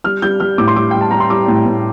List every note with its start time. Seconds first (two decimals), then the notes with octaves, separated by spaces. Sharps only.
0.04 G3 F6
0.22 G3 G6
0.40 G3 F6
0.58 A2 D6
0.68 C6
0.76 G3 D6
0.91 G3 G5
1.01 A5
1.11 G3 A#5
1.20 C6
1.30 G3 D6
1.48 A2
1.66 A2